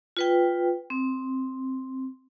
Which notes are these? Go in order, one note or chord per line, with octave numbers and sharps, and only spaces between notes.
F4 B4 G5
C4